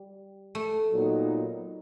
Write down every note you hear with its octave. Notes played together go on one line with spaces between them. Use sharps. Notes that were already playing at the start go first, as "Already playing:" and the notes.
Already playing: G3
A3
A#2 F#3 B3 D#4